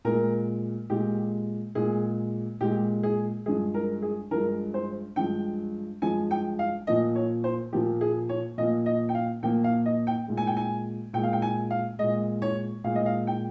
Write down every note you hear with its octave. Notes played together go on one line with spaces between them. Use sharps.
A#2 G#3 A#4
A#2 G#3 G4
A#2 G#3 G#4
A#2 G#3 G4
G#4
G2 F3 G#3 G#4
A#4
G#4
G2 F3 G#3 A#4
C5
G2 F3 G#3 G5
G2 F3 G#3 G#5
G5
F5
A#2 F3 A#3 D#5
C#5
C5
A#2 F3 A#3 G4
G#4
C#5
A#2 F3 A#3 D#5
D#5
G5
F5
A#2 F3 A#3 G5
F5
D#5
G5
A#2 G#3
G#5
G5
G#5
A#2 G#3 G5
F5
G5
G#5
F5
A#2 G#3 D#5
C#5
A#2 G#3 F5
D#5
F5
G5